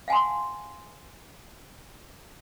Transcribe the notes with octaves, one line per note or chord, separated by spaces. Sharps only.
F5 F#5 G#5 A5 C6